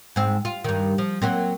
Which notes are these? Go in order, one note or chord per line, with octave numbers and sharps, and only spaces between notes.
G#2 C4
F4
G2 D#3
F3
F#3 A#3 C4